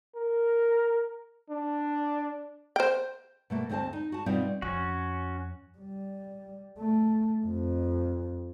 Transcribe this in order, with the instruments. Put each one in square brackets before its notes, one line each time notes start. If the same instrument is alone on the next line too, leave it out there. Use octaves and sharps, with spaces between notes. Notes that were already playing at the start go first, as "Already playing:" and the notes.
[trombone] A#4
D4
[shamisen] C5 G5
[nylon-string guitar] B2 A3 A#3
D2 C4 C5 D#5 A5
D#4
F#4 A5
B2 G3 C4 D#4 F4
[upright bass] F2 [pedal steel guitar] C#4 F#4
[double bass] G3
A3
F2